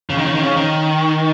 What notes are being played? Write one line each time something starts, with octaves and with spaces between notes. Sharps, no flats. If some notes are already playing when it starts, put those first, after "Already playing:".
C#3
D#3
C#3
D#3
C#3
D#3